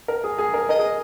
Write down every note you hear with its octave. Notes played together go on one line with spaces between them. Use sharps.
A#4
G#4
G#4
A#4
A#4 D#5
G#4